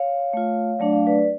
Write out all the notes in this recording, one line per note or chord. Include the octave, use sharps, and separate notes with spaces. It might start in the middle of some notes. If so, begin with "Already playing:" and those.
Already playing: C#5 F5
A3 F4
F#3 A3 D4 D5
F5
B4 D5